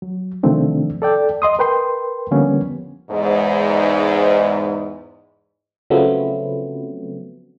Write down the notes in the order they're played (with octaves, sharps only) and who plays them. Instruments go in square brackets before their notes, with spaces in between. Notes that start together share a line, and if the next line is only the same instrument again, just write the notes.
[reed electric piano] F#3
C3 D#3 F3 A3 C4 D4
A4 D5 G5
D#5 C6 D#6
A#4 B4 G5 C6
D3 F3 G3 A#3 B3 C#4
[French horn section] E2 G#2
[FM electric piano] C#3 F3 F#3 A3 B3 C4